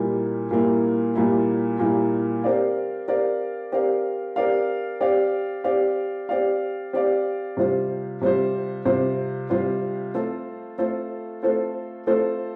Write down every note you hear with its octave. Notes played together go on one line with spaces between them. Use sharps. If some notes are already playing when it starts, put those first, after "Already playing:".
Already playing: A#2 G3 A#3 E4
A#2 G3 A#3 E4
A#2 G3 A#3 E4
A#2 G3 A#3 E4
C4 G4 A#4 D5 F5
C4 G4 A#4 D5 F5
C4 G4 A#4 D5 F5
C4 G4 A#4 D5 F5
C4 G4 D5 F5
C4 G4 D5 F5
C4 G4 D5 F5
C4 G4 D5 F5
C3 G3 C4 F4 C5
C3 G3 C4 F4 C5
C3 G3 C4 F4 C5
C3 G3 C4 F4 C5
A3 C4 F4 A4 C5
A3 C4 F4 A4 C5
A3 C4 F4 A4 C5
A3 C4 F4 A4 C5